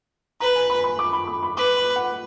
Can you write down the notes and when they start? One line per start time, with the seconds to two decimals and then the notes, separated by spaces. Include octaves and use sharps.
0.40 B4 A#5
0.55 G#5
0.70 B5
0.84 B5
0.99 D6
1.13 B5
1.27 D6
1.43 B5
1.57 B4 D6
1.77 B5
1.96 F#5